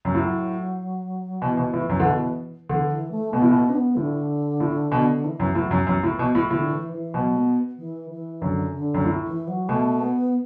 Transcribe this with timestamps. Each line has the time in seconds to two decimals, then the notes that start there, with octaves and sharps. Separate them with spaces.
0.05 F#2
0.14 A2 F#3
1.42 B2 E3
1.57 B2
1.74 A2
1.89 F#2
2.00 D3
2.06 B2
2.69 D3 E3
2.90 E3
3.11 A3
3.32 B2 B3
3.42 A2
3.51 B2 B3
3.69 D4
3.74 B3
3.96 A2 D3
4.60 A2
4.92 B2
5.24 E3
5.40 F#2
5.55 A2 F#3
5.71 F#2
5.87 F#2 E3
6.03 A2
6.19 B2
6.35 A2
6.51 A2 D3
6.72 E3
6.92 E3
7.14 B2 F#3
7.36 B3
7.78 E3
8.10 E3
8.41 F#2 D3
8.74 D3
8.94 F#2
9.05 A2
9.26 E3
9.47 F#3
9.68 B2 A3
10.00 B3